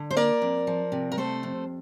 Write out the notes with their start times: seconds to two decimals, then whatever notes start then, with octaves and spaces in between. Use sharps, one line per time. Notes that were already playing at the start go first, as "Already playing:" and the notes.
Already playing: D3
0.11 C5
0.17 A#3 A#4 D5
0.42 F2
0.67 F3
0.92 C3
1.12 A#4
1.17 A3 A4 C5
1.43 F2